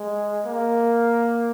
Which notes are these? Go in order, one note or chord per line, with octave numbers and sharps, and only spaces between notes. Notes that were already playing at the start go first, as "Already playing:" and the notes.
Already playing: G#3
A#3